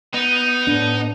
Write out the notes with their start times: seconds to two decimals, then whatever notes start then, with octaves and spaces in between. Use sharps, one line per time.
0.14 B3 D#4
0.67 A2 D4